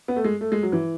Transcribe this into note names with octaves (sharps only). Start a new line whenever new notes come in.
B3
A3
G#3
A3
G#3
F#3
E3